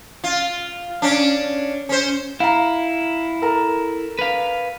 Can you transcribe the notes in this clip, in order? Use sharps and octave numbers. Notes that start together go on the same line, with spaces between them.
F4
C#4 D4
C#4 C5
E4 F5 A#5
A4 A#4
B4 F5